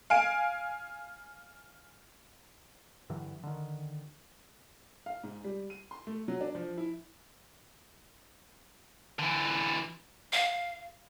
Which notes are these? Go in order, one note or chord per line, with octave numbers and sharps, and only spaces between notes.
F5 G#5 D7
G2 D3 E3 F#3
D3 D#3
F5
G#2
G3
D#7
C6
A3
F#3
D4
F3
E4
D3 E3
F5